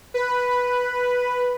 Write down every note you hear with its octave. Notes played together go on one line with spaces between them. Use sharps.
B4